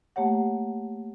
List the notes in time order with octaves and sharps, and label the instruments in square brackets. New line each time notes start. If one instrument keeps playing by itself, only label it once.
[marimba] A3 A#3 G4 C#5 F#5